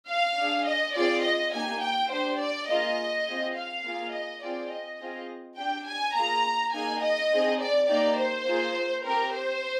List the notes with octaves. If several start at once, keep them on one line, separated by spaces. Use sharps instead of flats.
F5
D4 G#4
D#5
C4 F4 G#4 D5
D#5
A#3 D#4 G4 G#5
G5
D4 G4 C5
D5
A#3 F4 G#4 D#5
C4 F4 G#4
F5
A#3 F4 G#4
D#5
C4 F4 G#4 D5
D#5
C4 F4 G#4
D4 G4 G5
G#5
A#3 F4 G#4 A#5
A#3 D#4 G#4 G#5
D#5
C4 D#4 G#4
D5
A#3 D#4 G4 D5
C5
A#3 F4 G#4
C4 G4 A#4
C5